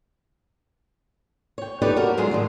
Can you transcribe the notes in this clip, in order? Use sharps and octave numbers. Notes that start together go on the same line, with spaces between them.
C#5 G5
D#4 G4 A4 B4 C#5 D5
F#4 A#4
D3 F#3 G#3 B3 F4 G#4
A2 D#3 G3